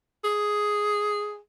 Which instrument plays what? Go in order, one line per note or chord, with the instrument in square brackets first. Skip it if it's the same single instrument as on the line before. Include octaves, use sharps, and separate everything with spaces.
[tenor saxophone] G#4